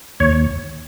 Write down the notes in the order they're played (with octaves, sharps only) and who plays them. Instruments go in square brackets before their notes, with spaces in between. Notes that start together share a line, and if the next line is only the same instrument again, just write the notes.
[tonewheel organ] D#2 C#5